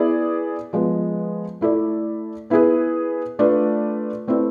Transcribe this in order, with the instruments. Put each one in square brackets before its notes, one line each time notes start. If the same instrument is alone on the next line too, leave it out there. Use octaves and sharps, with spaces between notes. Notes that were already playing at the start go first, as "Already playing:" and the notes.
Already playing: [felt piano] B3 E4 G#4 D5
F3 G#3 B3
A3 E4 A4 D5
B3 E4 G#4 B4
A3 D4 F4 B4 D5
A3 C4 E4 B4 D5